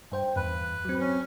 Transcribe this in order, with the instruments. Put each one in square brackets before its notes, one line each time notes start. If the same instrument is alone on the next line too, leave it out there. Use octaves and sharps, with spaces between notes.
[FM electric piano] G2 C5 G5
[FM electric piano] E2 G2 [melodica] B4
[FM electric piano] F#3 C4
[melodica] C#4